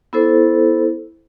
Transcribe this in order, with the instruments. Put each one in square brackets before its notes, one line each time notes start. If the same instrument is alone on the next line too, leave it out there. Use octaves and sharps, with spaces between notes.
[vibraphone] B3 E4 A4 C5